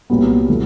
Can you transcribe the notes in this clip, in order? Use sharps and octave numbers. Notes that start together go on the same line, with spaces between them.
C2 A#2 F#3 B3
A2 E3 A3